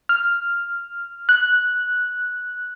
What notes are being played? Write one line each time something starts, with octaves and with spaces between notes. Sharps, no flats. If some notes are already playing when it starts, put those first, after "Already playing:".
F6
F#6